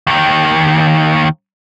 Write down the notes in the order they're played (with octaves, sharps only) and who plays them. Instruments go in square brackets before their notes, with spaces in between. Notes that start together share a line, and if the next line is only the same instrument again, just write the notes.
[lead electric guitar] D#2 D#3